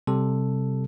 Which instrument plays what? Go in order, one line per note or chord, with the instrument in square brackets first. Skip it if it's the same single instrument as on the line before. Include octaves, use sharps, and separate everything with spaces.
[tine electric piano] C3 G3 A4